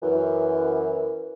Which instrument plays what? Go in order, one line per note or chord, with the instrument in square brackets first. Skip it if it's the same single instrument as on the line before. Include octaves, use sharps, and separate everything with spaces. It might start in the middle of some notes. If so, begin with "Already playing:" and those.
[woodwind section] F#2 E3